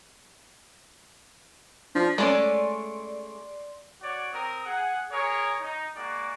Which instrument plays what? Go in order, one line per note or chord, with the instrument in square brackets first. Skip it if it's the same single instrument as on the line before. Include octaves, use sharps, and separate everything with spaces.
[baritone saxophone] F3 [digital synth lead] D4
[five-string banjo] G#3 A3 C#4 [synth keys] D5 C6
[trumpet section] F#4 C#5 D5
C4 A#4 D#6
G#4 F#5
G#4 A#4 C#5
D#4
G#3 A#3 F#4 D5